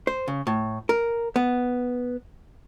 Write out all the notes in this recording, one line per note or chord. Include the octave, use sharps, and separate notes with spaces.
C5
C#3
A2
A#4
B3